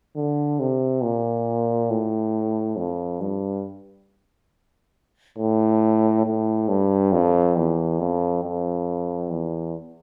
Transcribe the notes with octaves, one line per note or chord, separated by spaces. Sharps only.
D3
C3
A#2
A2
F2
G2
A2
A2
G2
F2
E2
F2
F2
E2